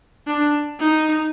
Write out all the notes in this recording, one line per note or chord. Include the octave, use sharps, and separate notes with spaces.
D4
D#4